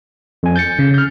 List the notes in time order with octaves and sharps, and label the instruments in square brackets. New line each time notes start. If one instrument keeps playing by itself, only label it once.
[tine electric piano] F2 G#5
G6 A6 C#7
[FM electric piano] C#3
[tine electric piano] F6 G6